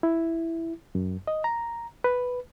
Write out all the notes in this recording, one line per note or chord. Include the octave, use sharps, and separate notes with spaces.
E4
F#2
D#5
A#5
B4